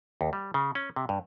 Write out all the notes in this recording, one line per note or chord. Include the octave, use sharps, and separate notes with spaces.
D#2
G3
C#3
C#4
C3
G2